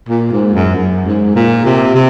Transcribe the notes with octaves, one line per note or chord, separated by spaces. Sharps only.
A#2
G#2
F#2
F#2
G#2
A#2
C3
C3